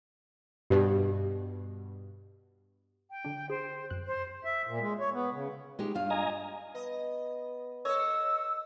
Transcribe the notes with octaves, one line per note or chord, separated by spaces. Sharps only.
G2 B2 G4
G5
D3 D4
G#4 C5
F#2 F#6
C5
E5
A#2
G#3
C#5
B3
C#3
G#3 D#4 G4
G2 F4 F5
D#5 G#5 A#5
B3 D#5
A4 C#5 D#5 E6